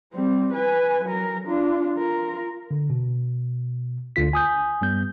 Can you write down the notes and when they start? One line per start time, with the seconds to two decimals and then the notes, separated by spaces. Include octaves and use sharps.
0.13 G3 C4
0.53 B4 G#5
1.05 F#3 A#4
1.47 D4 F4
1.98 F4 A#4
2.71 D3
2.90 B2
4.16 D2 D3 F4 B6
4.33 G#5 D#6 G6
4.81 G2 G3 B3 G6